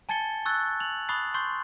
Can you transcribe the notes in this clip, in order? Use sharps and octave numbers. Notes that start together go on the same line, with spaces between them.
G#5 A5 G#6 A6 C#7 G7
C#6 E6 F#6 G#6 A6
F7 F#7
B5 C#6 D#6 F#6 A6 C7
C6 C#6 G6 C7